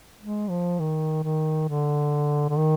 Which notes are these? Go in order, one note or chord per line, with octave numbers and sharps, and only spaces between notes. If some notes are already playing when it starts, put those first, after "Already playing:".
G#3
F3
D#3
D#3
D3
D3
D#3